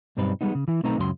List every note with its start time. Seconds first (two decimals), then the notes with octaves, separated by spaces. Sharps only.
0.17 B1 G2 G3 C4 D#4 B4
0.41 G3 G#3 B3 D#4
0.55 C#3
0.68 E3 E4
0.83 B1 A3 C4 D#4 B4 A#5
0.98 C#2 F#2 C#3 F#3 A4 C6